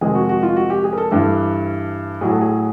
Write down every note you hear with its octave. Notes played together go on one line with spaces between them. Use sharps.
F2 C3 D#3 G#3 G#4
F#4
F#4
F4
F#4
G4
G#4
A#4
A4
G2 E3 G3 A4
A2 F#3 G#4
A4
G#4